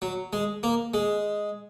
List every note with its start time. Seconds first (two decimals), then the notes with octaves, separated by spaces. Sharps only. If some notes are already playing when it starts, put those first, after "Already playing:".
0.02 F#3
0.33 G#3
0.63 A#3
0.94 G#3